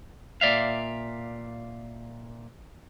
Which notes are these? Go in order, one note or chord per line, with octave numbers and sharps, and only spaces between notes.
A#2 D5 E5 F5